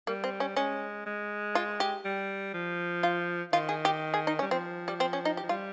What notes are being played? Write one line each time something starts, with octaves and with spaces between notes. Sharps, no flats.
G3 A#3
C4
C#4
G#3 C#4
G#3
F4
G4
G3
F3
F4
D#3 F4
G#4
G4
G#4
D#4
C#4
G3
F3 C4
G3
C4
C#4
D#4
G4
F3
G3 F4